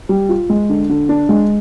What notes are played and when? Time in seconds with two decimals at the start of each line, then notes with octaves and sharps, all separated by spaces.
0.09 G3
0.29 F4
0.49 G#3
0.69 D3
0.89 D3
1.09 D4
1.29 G#3